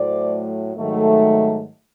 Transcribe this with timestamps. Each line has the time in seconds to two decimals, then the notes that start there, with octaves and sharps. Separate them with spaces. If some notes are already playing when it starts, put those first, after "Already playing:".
Already playing: A2 F#3 A3 C5 D5
0.76 G#2 D#3 F#3 A3